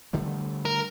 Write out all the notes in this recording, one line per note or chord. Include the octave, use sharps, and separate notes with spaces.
D3 G3 A3
A#4